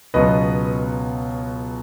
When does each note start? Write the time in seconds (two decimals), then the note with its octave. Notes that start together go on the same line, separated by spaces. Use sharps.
0.14 C#2 B2 F#3 B3 B4 D#5